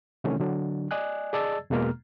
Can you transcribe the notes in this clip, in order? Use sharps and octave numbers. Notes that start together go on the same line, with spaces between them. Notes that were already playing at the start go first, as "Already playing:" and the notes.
C3 D#3 E3 F#3 A3 C#4
D3 F#3 D4
D5 D#5 G#5 F#6
G#4 D5 D#5 A5 E6 A6
E2 B2 G#3 A#3 A#5 F6